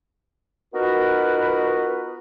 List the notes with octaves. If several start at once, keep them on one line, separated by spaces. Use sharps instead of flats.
B3 D#4 F4 F#4 A#4 B4